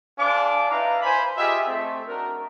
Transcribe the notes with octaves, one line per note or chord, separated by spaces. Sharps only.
D4 G#4 C5 F5 D6
D#4 E4 B4 D5 F5 A#5
C5 G#5 B5
F4 G4 G#4 D#5 E5
A3 C4
D4 D#4 F#4 A#4